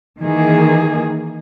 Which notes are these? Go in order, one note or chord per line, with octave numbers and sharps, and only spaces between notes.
D#3 E3 A#3 G#4